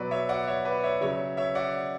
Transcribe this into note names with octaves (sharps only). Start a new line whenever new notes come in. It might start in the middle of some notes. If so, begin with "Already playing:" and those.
Already playing: B2 F#3 B4 D5
C#5 E5
D5 F#5
C#5 E5
B4 D5
C#5 E5
C#3 F#3 C#5 E5
C#5 E5
D5 F#5